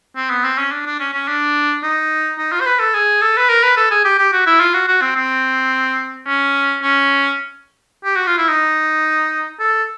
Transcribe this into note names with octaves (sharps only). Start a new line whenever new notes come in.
C4
B3
C4
C#4
D4
D4
C#4
C#4
D4
D#4
D#4
F4
C5
B4
A4
G#4
A4
B4
A#4
B4
A4
G#4
G4
G4
F#4
E4
F4
F#4
F#4
C4
C4
C#4
C#4
G4
F#4
F4
E4
D#4
A4